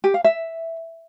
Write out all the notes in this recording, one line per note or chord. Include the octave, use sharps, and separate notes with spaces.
G4
F5
E5